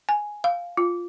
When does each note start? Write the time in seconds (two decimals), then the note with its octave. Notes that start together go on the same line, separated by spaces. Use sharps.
0.09 G#5
0.44 F5
0.77 F4